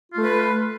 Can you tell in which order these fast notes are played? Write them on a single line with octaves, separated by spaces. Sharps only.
F4 A3 B4